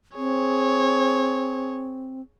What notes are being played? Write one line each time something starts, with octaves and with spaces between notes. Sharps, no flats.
C4 G#4 C#5